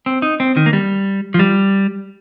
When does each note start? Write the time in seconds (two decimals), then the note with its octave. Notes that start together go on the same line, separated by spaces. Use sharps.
0.06 C4
0.22 D#4
0.40 C4
0.57 D#3
0.66 A#3
0.73 G3
1.34 F3
1.39 G3